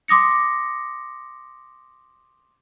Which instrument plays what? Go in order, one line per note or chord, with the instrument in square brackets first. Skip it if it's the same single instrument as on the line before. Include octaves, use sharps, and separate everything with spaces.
[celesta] C6 D6 D#6 A#6 C#7